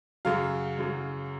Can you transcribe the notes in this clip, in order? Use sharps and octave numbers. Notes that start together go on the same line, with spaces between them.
F#2 C#3 F#3 F5
F#2 C#3 F#3